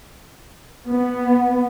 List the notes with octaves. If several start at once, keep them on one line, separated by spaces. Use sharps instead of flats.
B3